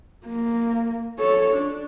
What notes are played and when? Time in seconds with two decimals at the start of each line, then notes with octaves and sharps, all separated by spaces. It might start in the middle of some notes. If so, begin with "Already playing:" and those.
0.25 A#3
1.19 A4 C#5
1.53 D4